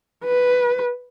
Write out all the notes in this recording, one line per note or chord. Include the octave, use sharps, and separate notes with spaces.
B4